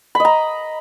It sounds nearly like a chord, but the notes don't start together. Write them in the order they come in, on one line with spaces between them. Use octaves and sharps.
B5 D#5 A#5